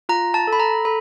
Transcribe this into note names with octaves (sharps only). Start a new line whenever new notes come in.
F4 A#5
A5
A4
B5
A#5
A4 B5